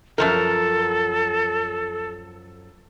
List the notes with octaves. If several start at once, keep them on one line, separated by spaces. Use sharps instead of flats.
F#2 F3 A4 A#4